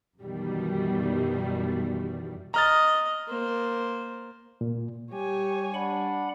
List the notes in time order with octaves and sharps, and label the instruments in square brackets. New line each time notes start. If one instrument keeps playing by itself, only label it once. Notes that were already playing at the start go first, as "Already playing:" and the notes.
[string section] F#2 B2 D#3 E3 G3
[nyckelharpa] D#5 [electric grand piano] A#5 F6 A6
[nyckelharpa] A#3 C5
[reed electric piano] A#2
[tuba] G3 [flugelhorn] G4 [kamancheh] C#5 G#5
[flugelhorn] D4 [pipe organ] F#5 B5